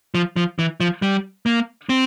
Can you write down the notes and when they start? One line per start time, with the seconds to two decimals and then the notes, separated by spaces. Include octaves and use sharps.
0.15 F3
0.36 F3
0.59 E3
0.80 F3
1.02 G3
1.46 A#3
1.89 C4